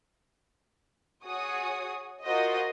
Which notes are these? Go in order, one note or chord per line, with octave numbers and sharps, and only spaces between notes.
F#4 G#4 C#5 G#5 D#6
F4 F#4 A#4 C5 D#5